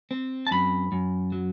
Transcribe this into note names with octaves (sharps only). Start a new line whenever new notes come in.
C4
A5
F#2 B5
F#2
F#3